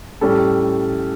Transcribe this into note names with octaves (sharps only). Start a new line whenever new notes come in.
A2 G3 C#4 A4